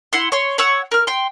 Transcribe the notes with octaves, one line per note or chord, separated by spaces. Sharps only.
E4 F#5 C6
C#5 C6
C#5 F#5 C#6 E6
A#4 F6
G5 C6